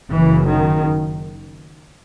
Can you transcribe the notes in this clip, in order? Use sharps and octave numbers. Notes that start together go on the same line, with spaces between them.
F#1 F#2 C#3 E3
D#3